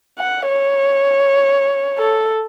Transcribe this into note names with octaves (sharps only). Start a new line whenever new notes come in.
F#5
C#5
A4